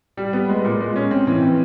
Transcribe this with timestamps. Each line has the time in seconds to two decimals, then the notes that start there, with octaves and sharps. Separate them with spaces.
0.17 G3
0.33 B3
0.49 G#3
0.65 A#2
0.80 G#3
0.96 C#4
1.11 C4
1.27 E3
1.43 C4